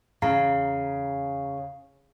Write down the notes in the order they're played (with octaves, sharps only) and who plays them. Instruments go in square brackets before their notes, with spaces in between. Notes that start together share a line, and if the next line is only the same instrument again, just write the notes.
[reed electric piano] E2 A#5 [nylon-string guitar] C#3 [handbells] F5